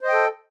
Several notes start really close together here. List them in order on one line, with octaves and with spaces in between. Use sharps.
C5 D#5 G5 A4